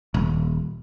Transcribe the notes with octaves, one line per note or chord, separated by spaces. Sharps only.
D#1